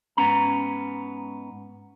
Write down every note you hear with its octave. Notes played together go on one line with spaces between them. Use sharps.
G#2 B3 C#4 A#5